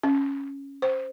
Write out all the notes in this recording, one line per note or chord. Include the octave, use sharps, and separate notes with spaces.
C#4
C5